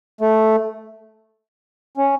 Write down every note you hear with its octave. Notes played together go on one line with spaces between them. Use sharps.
A3
C#4